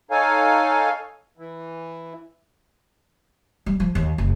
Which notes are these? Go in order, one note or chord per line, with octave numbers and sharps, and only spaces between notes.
D#4 A4 C#5 F5 G#5
E3
G3
F3
D#2
F#1